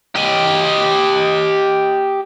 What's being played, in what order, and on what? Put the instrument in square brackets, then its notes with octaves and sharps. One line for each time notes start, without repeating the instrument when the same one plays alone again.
[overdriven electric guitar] G4 D#5